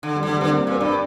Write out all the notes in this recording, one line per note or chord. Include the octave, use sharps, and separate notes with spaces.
D3
G3
D3
G3
D3 C4
A#3
A#2 C4
G2 D4